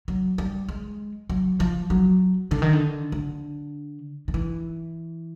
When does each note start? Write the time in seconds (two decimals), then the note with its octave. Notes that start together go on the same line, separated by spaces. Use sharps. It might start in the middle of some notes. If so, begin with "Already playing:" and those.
0.08 F#3
0.38 G3
0.69 G#3
1.30 F#3
1.60 F3
1.90 F#3
2.51 D3
2.62 D#3
2.73 D3
3.12 D3
4.28 D#3
4.34 E3